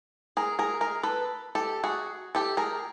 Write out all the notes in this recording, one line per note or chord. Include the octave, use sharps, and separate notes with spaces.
G#4 A#4
G#4 A#4
G#4 A#4
A4 B4
G4 A4
F#4 G#4
G4 A4
G#4 A#4